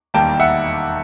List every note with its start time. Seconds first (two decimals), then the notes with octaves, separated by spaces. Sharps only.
0.14 E1 D#2 D#3 G3 A#3 G5 A5
0.39 E5 F#5